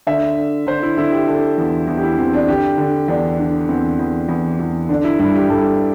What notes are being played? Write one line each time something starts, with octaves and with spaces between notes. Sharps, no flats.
D3 E5
D3
D3 C5
E4
D3 E4
G4
D3 A4
E2
E2
G4
E4
E2 C4
D4
D3 G4
D3
E2 D4
D3
E2 C4
E2
E2
E2
D3 D4
E4
G2 E4
G4
G2 A4